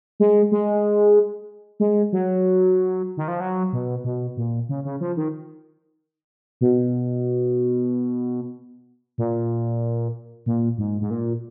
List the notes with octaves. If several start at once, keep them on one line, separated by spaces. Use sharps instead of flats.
G#3
G#3
G#3
F#3
D#3
F3
F#3
B2
B2
A#2
C#3
C#3
F3
D#3
B2
A#2
A#2
G#2
G#2
A#2